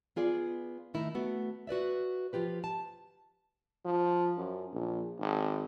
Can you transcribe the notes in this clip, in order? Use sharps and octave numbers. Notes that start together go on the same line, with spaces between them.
B3 F4 G#4 D5
D#3 A3 E4 A#4
A3 B3 F#4
F#4 B4 D5 E5
F3 F4 G4 B4
A5
F3
F#2
A#1
G#1